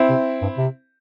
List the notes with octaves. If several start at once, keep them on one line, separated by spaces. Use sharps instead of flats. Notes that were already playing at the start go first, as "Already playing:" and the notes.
Already playing: C4 E4
C3
G2
C3